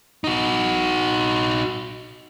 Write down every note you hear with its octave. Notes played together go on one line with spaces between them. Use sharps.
D#4 F#4